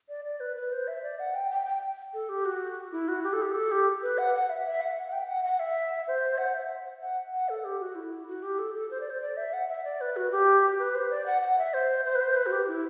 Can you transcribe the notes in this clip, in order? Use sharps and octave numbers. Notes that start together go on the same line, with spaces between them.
D5
D5
B4
B4
C5
E5
D5
F#5
G5
G5
G5
A4
G4
F#4
E4
F#4
G4
A4
G4
A4
G4
B4
F#5
F#5
E5
E5
F#5
F#5
G5
F#5
F#5
E5
C5
F#5
E5
F#5
F#5
A4
G4
F#4
E4
F#4
G4
A4
A4
C5
D5
C5
D5
E5
F#5
E5
D5
B4
F#4
G4
B4
C5
D5
F#5
F#5
E5
C5
C5
B4
C5
B4
F#4
G4
E4